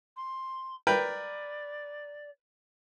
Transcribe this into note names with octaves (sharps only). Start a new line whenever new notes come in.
C6
A#4 B4 D5 G5